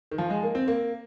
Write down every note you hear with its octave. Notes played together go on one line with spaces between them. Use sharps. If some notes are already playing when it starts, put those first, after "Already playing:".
D#3
F3
G#3
A#3
C4
A#3